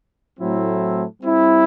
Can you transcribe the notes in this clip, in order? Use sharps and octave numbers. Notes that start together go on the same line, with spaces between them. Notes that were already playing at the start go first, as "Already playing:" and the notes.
A2 F#3 A3 C4 E4
G3 C4 E4